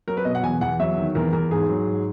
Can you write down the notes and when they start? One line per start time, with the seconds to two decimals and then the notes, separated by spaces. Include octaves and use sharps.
0.08 F#3 A#4
0.17 B4
0.25 B2 D#5
0.35 F#5
0.43 E2 G#5
0.61 E2 F#5
0.79 F#3 E5
0.98 D#3
1.15 E2 A#4
1.33 E2 A#4
1.51 G#2 G#4
1.69 F#3
1.87 G#2